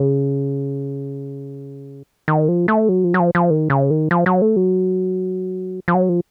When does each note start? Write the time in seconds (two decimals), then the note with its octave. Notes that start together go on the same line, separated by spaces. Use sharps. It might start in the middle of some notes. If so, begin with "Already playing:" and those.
Already playing: C#3
2.28 D#3
2.48 F3
2.68 A3
2.89 F#3
3.04 F3
3.14 F#3
3.20 F3
3.35 F3
3.50 D#3
3.70 C#3
3.90 D#3
4.11 F3
4.26 F#3
4.42 A3
4.56 F#3
5.88 F3
5.94 F#3
6.09 F3